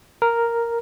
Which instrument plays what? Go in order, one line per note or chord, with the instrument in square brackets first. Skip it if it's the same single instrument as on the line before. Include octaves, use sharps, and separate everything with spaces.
[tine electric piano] A#4